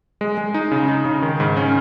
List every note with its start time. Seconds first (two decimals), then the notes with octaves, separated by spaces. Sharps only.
0.21 G#3
0.38 G#3
0.54 D#4
0.71 C#3
0.88 D#4
1.05 C#3
1.22 D#3
1.40 G#2
1.57 C#4